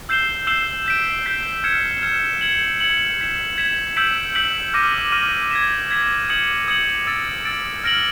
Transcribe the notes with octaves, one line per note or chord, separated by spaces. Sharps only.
E6 G6 C7 E7 G7
E6 G6 C7 E7 G7
G6 B6 D7
G6 B6 D7
F6 G#6 C#7 E7
F6 G#6 C#7 E7
G#6 C#7 F#7
G#6 C#7 F#7
G#6 B6 E7
G#6 B6 E7
E6 G6 B6 D7 F#7
E6 G6 B6 D7 F#7
D6 F6 A#6 D#7
D6 F6 A#6 D#7
G#6 B6 E7
G#6 B6 E7
D#6 G#6 C#7 F#7
D#6 G#6 C#7 F#7
E6 A6 D7
E6 A6 D7
F6 A#6 D7 F#7